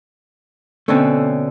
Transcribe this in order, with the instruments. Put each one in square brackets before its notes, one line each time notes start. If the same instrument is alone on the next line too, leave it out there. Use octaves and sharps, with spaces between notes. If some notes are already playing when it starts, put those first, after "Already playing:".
[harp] B2 D3 C#4 [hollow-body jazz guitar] A3 C4